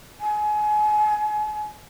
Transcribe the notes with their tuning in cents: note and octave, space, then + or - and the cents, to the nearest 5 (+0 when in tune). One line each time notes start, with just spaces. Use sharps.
G#5 +30